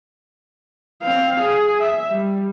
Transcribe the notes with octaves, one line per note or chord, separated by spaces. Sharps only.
C4 F5
G#4
E5
G3